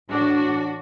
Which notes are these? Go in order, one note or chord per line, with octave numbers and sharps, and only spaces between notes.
A2 E3 D4 F#4